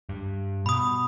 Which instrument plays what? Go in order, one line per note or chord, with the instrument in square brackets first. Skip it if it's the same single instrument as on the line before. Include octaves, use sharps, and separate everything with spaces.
[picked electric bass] G2
[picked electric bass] B2 [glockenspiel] B5 D#6